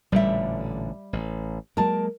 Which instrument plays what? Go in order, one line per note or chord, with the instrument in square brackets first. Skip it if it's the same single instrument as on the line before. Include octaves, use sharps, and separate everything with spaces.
[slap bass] A1 A#2 D3 [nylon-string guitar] G3 E5
[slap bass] A1
[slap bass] F#3 G#3 A#3 [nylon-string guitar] A#4 A5